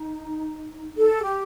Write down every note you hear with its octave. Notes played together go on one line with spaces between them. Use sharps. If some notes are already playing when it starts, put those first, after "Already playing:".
Already playing: D#4
A4
G4